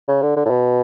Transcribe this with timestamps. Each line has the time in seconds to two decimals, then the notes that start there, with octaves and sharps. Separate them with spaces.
0.08 C#3
0.22 D3
0.36 D3
0.45 A2
0.50 B2